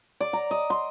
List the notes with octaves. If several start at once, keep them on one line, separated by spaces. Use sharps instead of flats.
D5
A#5
D#5
C6